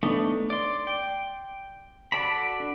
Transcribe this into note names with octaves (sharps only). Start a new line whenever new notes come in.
A3 B3 D4 D#4
D5 C6
G5
F#4 A4 D5 A5 B5
D4